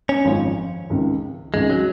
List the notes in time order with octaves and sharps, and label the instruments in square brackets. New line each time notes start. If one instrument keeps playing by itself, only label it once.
[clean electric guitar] C#4
[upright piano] G#1 F#2 F3 G#3
C#2 C3 D#3
[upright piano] C#2 C3 D#3 [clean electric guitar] G#3
[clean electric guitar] F#3